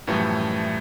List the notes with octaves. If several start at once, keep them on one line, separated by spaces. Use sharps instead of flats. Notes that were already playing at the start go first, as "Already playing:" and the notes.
F#2 A2 E3 F3 G3 A3